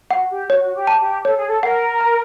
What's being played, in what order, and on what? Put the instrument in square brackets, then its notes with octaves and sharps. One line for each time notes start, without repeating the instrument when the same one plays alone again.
[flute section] F#4 [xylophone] F#5
[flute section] G4
[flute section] F#4 [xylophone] C#5
[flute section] F#4
G4
[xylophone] A5
[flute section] G4
[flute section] A4 [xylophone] C#5
[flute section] G#4
A4
[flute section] A#4 [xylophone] F#5
[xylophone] A#5